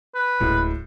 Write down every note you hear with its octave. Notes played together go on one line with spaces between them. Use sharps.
B4
D1 A2 G#3 F#4